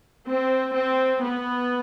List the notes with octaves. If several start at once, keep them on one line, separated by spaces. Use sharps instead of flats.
C4
C4
B3